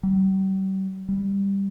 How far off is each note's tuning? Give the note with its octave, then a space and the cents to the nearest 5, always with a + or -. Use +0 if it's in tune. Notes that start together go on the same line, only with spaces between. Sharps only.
G3 -40
G3 +10